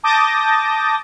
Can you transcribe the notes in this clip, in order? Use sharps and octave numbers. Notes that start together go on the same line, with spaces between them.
A5 D6 D#6 G6 A6 A#6